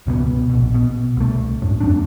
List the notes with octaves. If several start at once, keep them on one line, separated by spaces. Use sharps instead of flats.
C#2 B2 F3 B3
A#1 B2
B2
C2 A3
F#2 A2
F2 F#3 C4 D4